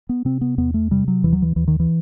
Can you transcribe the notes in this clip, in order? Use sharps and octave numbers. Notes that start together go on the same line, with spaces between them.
B3
C3 C4
B3
E2 B3
A3
C3 G3
F#3
D#2 E3
F#3
E3
D#2 E3
D#3
E3